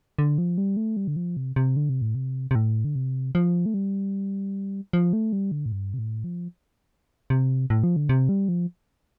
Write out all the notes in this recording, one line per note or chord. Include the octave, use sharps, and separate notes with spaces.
D3
F3
G3
A3
G3
D3
F3
C3
C3
D3
C3
A2
C3
C3
A2
D3
C3
F3
A3
G3
F3
A3
G3
D3
A2
G2
C3
A2
F3
C3
A2
F3
D3
C3
G3
F3